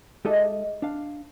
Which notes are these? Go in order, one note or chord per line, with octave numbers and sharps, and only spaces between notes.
G#3 D#4 G4 A4 D#5 E5
D4 F5